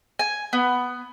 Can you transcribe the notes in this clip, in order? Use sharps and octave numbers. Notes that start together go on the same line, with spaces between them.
G#5
B3